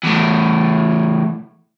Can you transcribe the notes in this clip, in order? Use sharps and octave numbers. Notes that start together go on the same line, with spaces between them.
E2 A2